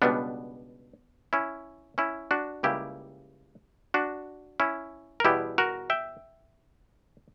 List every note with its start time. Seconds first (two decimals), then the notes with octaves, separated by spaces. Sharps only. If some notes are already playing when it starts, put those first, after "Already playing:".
0.02 C#2 B2 G3 B3 D4
1.33 C#4 E4
1.98 C#4 E4
2.31 D4 F#4
2.63 C#2 C#3 G3 A#3 E4 G4
3.94 D4 F#4
4.60 C#4 E4
5.20 A#4
5.24 E2 B2 G3 B3 E4 G4
5.58 F#4 A#4
5.90 E5 G5